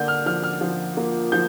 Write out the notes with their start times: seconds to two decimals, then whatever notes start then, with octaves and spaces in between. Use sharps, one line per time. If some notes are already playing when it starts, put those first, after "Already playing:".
Already playing: D3 A#3 D4 G6
0.08 F6
0.26 F3 F6
0.43 F6
0.61 F3
0.97 A#3
1.32 F3 G6